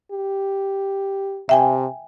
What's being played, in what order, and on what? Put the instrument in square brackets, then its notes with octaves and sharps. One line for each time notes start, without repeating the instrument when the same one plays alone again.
[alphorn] G4
[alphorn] C3 [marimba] E5 G5 G#5